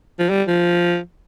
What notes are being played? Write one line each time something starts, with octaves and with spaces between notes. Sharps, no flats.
F3
G3
F3